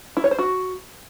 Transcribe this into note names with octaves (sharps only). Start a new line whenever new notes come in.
E4
C#5
C5
F#4